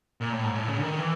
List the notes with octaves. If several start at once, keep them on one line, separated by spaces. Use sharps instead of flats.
A#2
A2
G#2
A2
C#3
D3
D#3
E3